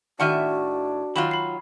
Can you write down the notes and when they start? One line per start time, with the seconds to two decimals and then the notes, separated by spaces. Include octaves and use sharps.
0.20 A2 D#3 D4 F#4 E5 F#5 F6 D#7
1.16 D#3 F#3 F4 B5 E7
1.31 B5 C7